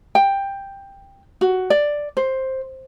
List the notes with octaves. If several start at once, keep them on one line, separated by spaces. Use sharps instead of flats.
G5
F#4
D5
C5